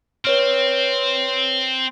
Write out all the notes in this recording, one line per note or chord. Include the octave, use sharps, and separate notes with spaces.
C4 B4 C#5 F6